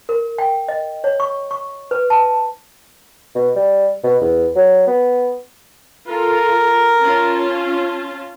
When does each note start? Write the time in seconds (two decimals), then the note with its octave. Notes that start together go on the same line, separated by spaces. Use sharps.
0.09 A#4
0.38 G5
0.68 D#5
1.04 C#5
1.20 C#6
1.51 C#6
1.91 B4
2.10 A5
3.35 B2
3.56 G3
4.04 B2
4.21 E2
4.56 F#3
4.87 B3
6.08 F4 A4 A#4
7.01 C#4 F4 A5